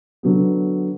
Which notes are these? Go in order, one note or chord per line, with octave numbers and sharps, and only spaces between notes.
D3 F#3 B3